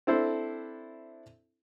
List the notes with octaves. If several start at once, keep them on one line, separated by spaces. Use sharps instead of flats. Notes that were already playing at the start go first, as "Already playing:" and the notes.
C4 D4 E4 A4 C5